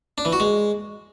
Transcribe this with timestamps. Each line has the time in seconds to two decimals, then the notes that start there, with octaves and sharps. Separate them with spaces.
0.18 D4
0.25 E3
0.33 F#4
0.40 G#3